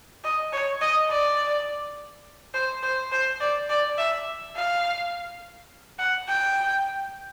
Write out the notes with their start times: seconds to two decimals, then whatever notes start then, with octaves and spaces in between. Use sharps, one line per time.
0.24 D#5
0.53 C#5
0.81 D#5
1.10 D5
2.54 C5
2.83 C5
3.12 C5
3.40 D5
3.69 D5
3.98 E5
4.55 F5
5.99 F#5
6.28 G5